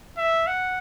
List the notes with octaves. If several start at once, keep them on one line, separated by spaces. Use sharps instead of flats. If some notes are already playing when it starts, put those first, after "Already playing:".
E5
F#5